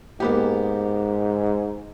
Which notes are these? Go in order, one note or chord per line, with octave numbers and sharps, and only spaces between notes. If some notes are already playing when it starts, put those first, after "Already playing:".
G#2 A#3 B3 G4